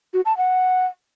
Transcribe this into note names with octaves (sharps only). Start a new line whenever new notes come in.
F#4
A5
F#5